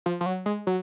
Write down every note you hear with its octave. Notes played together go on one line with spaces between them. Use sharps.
F3
F3
F#3
G#3
F#3